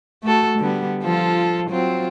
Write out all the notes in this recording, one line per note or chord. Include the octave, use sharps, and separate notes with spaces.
A3 F#4 A4
D3 G3 B3
F3 F4 A4
F#3 C4 F4